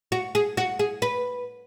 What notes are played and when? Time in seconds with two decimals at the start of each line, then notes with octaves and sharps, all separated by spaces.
0.12 F#4
0.35 G#4
0.57 F#4
0.79 G#4
1.02 B4